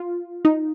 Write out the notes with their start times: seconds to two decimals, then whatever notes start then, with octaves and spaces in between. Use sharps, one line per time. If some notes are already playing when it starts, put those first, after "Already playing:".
Already playing: F4
0.45 D#4